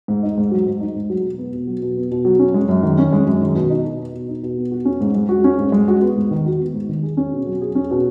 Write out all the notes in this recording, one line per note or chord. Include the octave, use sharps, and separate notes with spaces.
G#2
D#4
G#2
F#3
G#2
D#4
G#2
F#3
B2
B3
B2
F#3
B2
B3
B2
F#3
C#4
G#3
F#2
D#3
C#4
G#3
F#2
D#3
B2
D#4
B2
B3
B2
D#4
B2
B3
F#4
C#4
G#2
G#3
F#4
C#4
G#2
G#3
F#4
B3
G#2
D#3
F#4
B3
G#2
D#3
G#4
C#4
B2
F#3
G#4
C#4
B2